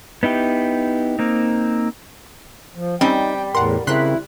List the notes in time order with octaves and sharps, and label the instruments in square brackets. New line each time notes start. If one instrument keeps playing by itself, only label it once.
[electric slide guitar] B3 D#4 E4 G4
A#3 C4 D#4
[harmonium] F3
[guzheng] G3 [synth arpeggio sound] C4 C#4 [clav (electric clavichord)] D#4 [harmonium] G5
[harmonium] E2 A2 [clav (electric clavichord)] A#4 [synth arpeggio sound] F#5 C6
[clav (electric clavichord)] C#3 C4 A#4 [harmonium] E4 [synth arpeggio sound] C6 F#6 B6